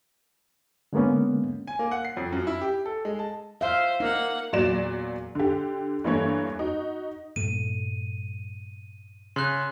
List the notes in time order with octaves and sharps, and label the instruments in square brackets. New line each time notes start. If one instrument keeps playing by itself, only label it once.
[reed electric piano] D3 G#3 A#3 B3 C#4
[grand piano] G#5
A#3
F#5
C7
F2
F#2
E4
G4
A4
G#3
A5
[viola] C5 [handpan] E5 F5
[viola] A#3 F#5 [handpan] D#4
[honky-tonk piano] E2 A#2 F#3 D5 E7
D3 G4
G2 E3 A3 A#3 C#5
D#4 F#4
[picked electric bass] G2 A#2 A3 [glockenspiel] D#7
[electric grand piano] C#3 [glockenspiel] C6 F#6